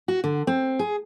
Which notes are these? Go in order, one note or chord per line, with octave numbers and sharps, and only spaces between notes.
F#4
D3
C4
G#4